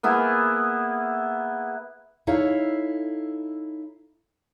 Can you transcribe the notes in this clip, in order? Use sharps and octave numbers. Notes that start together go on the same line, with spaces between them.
A#3 B3 E4 G#4
D#4 E4 A4 C#5 F5